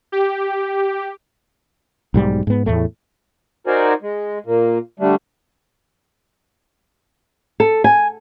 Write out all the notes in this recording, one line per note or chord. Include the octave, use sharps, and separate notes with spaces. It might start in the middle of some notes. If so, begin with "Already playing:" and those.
G4
B1 G#2 G3
G#2 B3
E2 A2 A3
D#4 F#4 A#4 C5 D5 G#5
G#3
A#2 A#3
D3 G3 A3 D4
A4
G#5